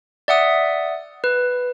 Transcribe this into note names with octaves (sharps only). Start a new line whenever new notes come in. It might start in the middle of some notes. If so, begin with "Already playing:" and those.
D5 E5 F#5 D#6
B4